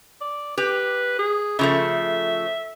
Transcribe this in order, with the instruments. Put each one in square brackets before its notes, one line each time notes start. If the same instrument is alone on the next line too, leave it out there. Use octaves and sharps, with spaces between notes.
[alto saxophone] D5
[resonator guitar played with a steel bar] G4 [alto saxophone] B4
[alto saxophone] G#4
[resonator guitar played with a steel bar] C#3 F3 A3 [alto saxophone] E5